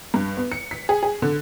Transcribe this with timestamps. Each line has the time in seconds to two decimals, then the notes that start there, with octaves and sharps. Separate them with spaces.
0.14 G2
0.37 B3
0.52 C#7
0.71 B6
0.89 G#4
1.03 G#4
1.22 D3